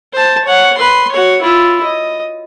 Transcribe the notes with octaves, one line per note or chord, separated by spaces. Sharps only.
C5 A5
C#5 F#5
B4 C6
F#4 C#5
E4 F4
D#5